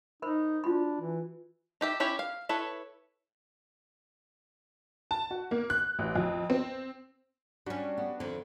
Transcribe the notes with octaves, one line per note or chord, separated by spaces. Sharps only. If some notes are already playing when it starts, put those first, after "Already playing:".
D#4 A#4 C5 B5
D4 F4 F#4 B5
E3
D#4 G4 E5
C#4 E4 G4 C#5
F5
E4 A4 B4 C#5
A5
F#4
A#3
F#6
A1
F2
C4
G3 C#4 D4 F#4
B3
F2 D3 D#3